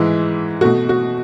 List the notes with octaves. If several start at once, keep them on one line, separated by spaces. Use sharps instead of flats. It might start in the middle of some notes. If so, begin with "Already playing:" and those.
Already playing: G#2 E3 G#3 E4
B2 A3 F#4
F#4